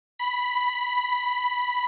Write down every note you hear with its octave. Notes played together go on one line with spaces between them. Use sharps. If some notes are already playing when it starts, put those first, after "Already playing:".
B5